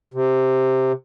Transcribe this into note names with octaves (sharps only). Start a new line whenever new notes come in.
C3